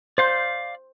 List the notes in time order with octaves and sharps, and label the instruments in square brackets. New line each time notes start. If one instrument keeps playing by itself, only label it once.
[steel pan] C5 [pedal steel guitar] D5 F5 G6